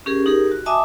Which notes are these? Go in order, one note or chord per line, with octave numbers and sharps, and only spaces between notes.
C#4 G4 G#4 A#4
D#4 G4 G#4 A#4
F#4
D#5 E5 G#5 A5 D6 D#6